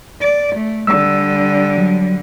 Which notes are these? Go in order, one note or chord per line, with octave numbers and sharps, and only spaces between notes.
D5
A3
D3 G3 E6
F#3